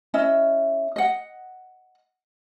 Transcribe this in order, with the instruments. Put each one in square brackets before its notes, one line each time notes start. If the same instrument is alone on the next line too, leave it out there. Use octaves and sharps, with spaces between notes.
[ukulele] C#4 E4 D#5 E5
D#5 F#5